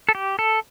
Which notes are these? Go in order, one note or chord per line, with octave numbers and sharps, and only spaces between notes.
A4
G4
A4